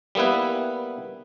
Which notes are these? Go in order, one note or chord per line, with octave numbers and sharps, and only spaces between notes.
G3 A#3 B3 E4 B4